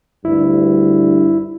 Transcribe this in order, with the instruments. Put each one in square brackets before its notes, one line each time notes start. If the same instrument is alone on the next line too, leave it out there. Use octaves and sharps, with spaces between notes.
[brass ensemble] D2 G2 [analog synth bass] E4